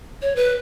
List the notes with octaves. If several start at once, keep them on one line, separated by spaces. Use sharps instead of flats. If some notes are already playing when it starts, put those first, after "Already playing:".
C#5
B4